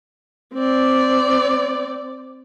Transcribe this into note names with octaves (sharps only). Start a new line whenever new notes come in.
C4 D5